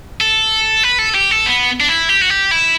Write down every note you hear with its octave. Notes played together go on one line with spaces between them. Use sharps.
A4
B4
A4
G4
A4
B3
D4
E4
G4
F#4
G4
E4